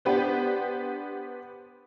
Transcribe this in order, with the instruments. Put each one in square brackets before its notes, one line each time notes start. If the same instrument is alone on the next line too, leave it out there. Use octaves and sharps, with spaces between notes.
[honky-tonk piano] B3 D4 G4 B4 C5